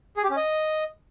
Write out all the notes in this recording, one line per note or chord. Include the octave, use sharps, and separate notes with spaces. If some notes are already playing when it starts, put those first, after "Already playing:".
G#4
G4
C#4
D#5